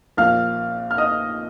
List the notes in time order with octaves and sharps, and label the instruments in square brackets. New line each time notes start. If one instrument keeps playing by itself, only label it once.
[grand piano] A#1 A#2 F5 F6
F6
D#5 D#6